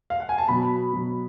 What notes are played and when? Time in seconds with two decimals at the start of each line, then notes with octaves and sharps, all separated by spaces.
0.10 F5
0.20 F#5
0.29 G#5
0.38 A5
0.48 B2 F#3 B5
0.93 B2 F#3